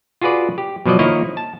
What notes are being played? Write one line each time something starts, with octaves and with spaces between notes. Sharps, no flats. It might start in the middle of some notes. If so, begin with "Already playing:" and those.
F4 F#4 G#4 B4 D5
G4
B2 F3 F#3 D5 D#5
D#3 F3 A#3 E4 C#5 D#5
A5